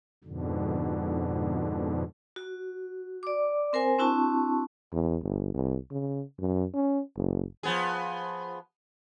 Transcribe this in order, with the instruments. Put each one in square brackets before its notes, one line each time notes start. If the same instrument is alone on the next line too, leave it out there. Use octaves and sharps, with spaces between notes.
[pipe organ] F2 G#2 B2 D3
[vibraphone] F#4
D5 D6
C4 A#4 C5 G#5
C4 D4 E4 F#4 A5 C#6
[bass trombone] E2
G1
C2
C#3
F#2
C#4
F#1
[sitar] F3 B3 G#4